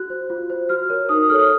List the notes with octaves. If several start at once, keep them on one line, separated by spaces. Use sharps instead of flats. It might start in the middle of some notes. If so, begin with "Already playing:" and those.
Already playing: F#4 F#6
C5
F4
C5
F#4 F6
A#4 C#5
D#4 D#6
A4 C#5 F6
D#6